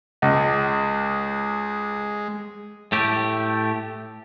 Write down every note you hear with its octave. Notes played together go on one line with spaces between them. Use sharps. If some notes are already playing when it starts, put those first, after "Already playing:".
C#2 G#3
A2 A3 G4